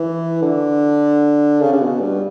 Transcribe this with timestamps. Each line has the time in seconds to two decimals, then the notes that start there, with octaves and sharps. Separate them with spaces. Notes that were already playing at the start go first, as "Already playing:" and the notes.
Already playing: E3
0.42 D3
1.61 C#3
1.73 C#3
1.81 B2
2.01 G2